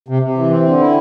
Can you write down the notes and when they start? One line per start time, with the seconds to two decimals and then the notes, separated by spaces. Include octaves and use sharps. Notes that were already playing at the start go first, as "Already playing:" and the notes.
0.08 C3
0.22 C3
0.37 E3
0.51 C4
0.66 D3
0.80 E4